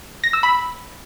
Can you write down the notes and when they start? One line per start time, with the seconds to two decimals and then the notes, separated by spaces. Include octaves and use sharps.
0.24 A#6
0.33 E6
0.43 B5